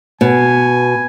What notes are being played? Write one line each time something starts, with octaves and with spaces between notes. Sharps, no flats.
B2 G#5